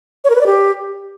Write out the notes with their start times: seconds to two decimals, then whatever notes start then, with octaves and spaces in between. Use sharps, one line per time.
0.24 C#5
0.30 A#4
0.35 B4
0.41 D5
0.46 G4